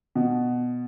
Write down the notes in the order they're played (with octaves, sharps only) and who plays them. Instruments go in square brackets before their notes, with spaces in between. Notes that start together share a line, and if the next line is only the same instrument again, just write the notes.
[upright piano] B2